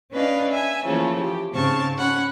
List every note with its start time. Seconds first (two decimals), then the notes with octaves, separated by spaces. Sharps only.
0.11 C#4 D4 B4 D#5 F5
0.50 E5 G#5
0.84 C#3 E3 F3 A3 A#3
1.20 G4
1.53 G#2 C#3 C4 A5 C#6 F6
1.98 C#4 F#5 B5 C#6